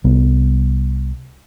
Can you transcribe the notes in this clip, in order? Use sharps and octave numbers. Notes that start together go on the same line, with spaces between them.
C2 G3 B3